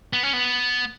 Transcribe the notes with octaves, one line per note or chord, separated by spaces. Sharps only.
B3
C#4
B3